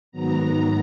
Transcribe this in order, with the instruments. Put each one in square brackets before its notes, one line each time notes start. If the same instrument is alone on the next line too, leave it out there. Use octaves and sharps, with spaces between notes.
[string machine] G#2 D#3 F#3 B3 A#5